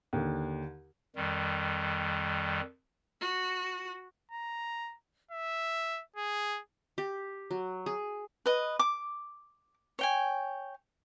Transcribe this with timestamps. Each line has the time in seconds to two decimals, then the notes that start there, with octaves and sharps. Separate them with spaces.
0.13 D#2 D3
1.16 F2 D#3 G3
3.21 F#4
4.32 A#5
5.32 E5
6.17 G#4
6.98 G4
7.51 F#3
7.86 G#4
8.46 B4 D#5
8.79 D6
9.99 C#5 G5 G#5